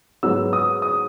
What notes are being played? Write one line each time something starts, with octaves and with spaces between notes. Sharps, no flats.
G#2 F#3 B3 E6
D#6
D#6